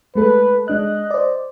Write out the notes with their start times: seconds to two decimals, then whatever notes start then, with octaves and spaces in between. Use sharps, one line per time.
0.15 G#3 A3 A4 B4
0.68 G#3 D4 D#5 F#6
1.11 C5 D5